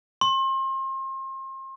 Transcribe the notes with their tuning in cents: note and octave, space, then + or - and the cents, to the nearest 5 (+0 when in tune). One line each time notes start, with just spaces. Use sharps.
C6 +35